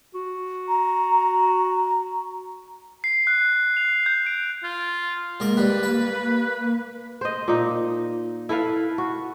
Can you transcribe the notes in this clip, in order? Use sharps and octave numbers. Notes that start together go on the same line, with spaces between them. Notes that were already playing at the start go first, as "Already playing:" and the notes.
F#4
A#5
C7
F#6
F7
G6
D7
F4
G#2 A#3 A#4 D6
G3 G4 B4
A5 B5
C5 D#5
A#2 D#4
E4 A4 B4 F5
F#4